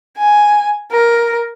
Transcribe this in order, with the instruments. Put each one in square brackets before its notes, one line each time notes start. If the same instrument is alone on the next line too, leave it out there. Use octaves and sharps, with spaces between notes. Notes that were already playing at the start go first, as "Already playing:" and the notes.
[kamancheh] G#5
A#4